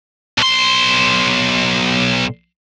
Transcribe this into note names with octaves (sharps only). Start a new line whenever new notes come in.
B1 C6